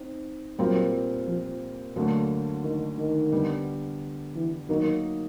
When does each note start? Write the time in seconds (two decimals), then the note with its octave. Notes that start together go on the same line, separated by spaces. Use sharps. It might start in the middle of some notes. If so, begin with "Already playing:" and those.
Already playing: C4 D#4
0.59 A#2 F#3 G3 C4 F4 A#4
1.28 F3
1.96 D2 D3 F#3 A#3 D4
2.64 D#3
2.98 D#3
3.32 D3 G3 B3
4.35 E3
4.69 D#3 F#3 A#3 D#4